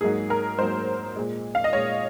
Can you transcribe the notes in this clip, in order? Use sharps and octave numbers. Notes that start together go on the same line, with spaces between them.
G#2 F#3 A#3 G#4
A#4
G#2 F#3 A#3 C5
A#2 G#3
F5
D#5
A#2 G#3 C#5